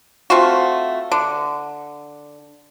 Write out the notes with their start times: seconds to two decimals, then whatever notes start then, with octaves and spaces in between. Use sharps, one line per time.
0.30 A3 C4 F4 F#4
1.12 D3